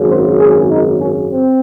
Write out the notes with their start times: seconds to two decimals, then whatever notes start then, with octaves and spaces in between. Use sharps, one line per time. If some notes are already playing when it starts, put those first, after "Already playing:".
Already playing: G#1 F#2 C#3
0.09 C5
0.40 G#4
0.70 D#4
1.00 C#4
1.31 C4